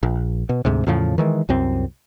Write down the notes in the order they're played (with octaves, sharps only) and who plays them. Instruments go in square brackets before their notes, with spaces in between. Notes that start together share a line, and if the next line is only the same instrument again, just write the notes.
[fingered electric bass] A#1
B2
D2 G#2 C3
E2 A2 C#3 F3
D#3 E3 G#3
C2 F#2 C4